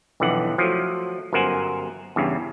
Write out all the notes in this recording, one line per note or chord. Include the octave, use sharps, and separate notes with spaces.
B1 F2 D3 E3 F#5
F3 F#3 A3
G1 F#2 A#4 C5 F#5 G#5
E2 G2 C#3